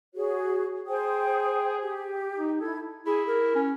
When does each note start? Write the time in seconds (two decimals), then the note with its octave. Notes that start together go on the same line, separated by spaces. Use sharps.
0.15 F#4 G#4 C#5
0.87 G#4 C5 G5 D#6
1.80 G4
2.36 D#4
2.61 E4 A4 G#6
3.06 E4 G#4
3.28 A#4
3.55 C#4